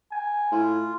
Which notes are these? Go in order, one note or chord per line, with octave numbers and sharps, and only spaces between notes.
G#5
A2 F4